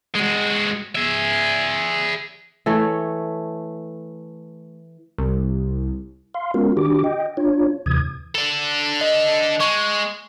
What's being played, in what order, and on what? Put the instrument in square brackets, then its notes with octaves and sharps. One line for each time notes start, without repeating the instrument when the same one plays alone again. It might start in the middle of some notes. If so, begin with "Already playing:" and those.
[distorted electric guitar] G#3 F#4
G#4 E5
[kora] E3 A3 C#5
[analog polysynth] C2
[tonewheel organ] F5 C6
G#3 B3 C#4 F4 F#4 A#4
D#3 D4 F#4 G4 D6
D#5 G5
D4 F4 C#5
D#2 C3 E3 D#6 G#6
[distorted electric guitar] D4 A4
[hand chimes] D#5
[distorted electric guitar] G#3 [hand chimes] C#6